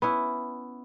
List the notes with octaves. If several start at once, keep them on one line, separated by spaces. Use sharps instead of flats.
B3 C#4 E4